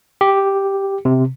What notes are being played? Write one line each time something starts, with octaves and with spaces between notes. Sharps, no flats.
G4
C3